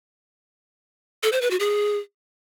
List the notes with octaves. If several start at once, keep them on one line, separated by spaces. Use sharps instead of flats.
A4
C5
B4
F#4
G#4